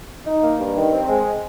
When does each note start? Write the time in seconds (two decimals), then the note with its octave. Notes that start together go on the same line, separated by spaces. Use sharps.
0.25 D#4
0.42 A#3
0.58 G2
0.76 D#3
0.92 C4
1.09 G#3